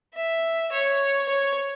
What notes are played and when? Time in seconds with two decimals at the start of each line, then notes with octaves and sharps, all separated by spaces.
0.15 E5
0.72 C#5
1.29 C#5